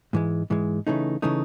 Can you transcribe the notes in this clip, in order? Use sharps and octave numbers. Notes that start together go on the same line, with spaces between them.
G#2 E3 G#3
G#2 E3 G#3
C#3 E3 A3 D#4
C#3 E3 A3 D#4